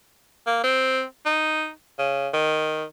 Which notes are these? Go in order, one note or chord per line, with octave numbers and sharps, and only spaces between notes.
A#3
C4
D#4
C#3
D#3